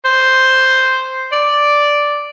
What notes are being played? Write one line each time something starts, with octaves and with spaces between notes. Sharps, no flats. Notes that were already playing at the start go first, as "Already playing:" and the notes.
C5
D5